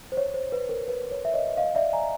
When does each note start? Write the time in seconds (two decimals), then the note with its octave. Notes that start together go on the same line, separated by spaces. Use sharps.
0.12 C5
0.17 C#5
0.34 C5
0.52 B4
0.69 A#4
0.88 B4
1.11 C#5
1.25 E5
1.34 C#5 D#5
1.57 D#5 F5
1.75 D5 E5
1.93 G#5 A#5